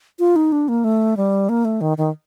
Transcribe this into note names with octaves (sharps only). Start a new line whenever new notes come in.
F4
D#4
D4
A#3
A3
G3
A#3
A3
D#3
D#3